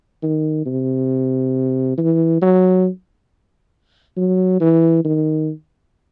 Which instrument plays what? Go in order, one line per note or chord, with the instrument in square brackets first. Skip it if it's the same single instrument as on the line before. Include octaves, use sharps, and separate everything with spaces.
[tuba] D#3
C3
E3
F#3
F#3
E3
D#3